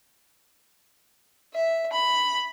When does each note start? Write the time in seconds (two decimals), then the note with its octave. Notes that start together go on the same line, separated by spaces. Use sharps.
1.54 E5
1.92 B5